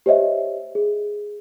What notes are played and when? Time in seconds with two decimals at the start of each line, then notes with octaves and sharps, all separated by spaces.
0.06 G4 C5 C#5 D#5 E5
0.75 G#4